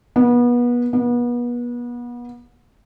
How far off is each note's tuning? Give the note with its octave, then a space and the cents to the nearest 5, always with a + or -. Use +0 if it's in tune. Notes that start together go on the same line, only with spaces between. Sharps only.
B3 -30
B3 -35